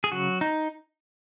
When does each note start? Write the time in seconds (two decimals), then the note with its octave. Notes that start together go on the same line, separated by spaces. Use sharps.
0.04 G#4
0.12 C#3 F#3 F#4
0.41 D#4